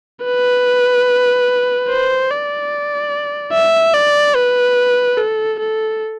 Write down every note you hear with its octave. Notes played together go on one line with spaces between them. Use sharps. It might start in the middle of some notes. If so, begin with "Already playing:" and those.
B4
C5
D5
E5
D5
B4
A4
A4